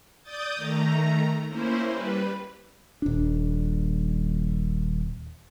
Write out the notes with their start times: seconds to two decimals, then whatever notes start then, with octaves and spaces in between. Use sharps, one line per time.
0.23 D5 D#6 G6 A6
0.56 D#3 A3 A#5
1.49 A#3 C#4 E4 C5
1.89 G3 B4
3.02 D#1 D4